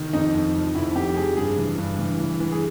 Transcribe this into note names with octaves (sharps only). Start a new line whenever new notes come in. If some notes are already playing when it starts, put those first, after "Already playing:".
Already playing: D#3
F2 D#4
F2
F3
F2 E4
F2 G4
F3 G#4
G2 G#4
E3
G2
E3
E3
E3
G#4